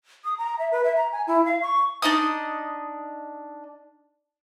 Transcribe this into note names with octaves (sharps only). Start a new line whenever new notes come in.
D#6
A#5
E5
B4
E5
A#5
G#5
E4
F5
C#6
D4 D#4 D#5 D#6